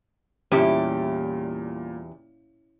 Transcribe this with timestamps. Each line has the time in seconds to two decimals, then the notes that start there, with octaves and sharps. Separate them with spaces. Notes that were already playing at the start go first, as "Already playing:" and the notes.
0.52 E2 A#2 G3 C#4 E4 G4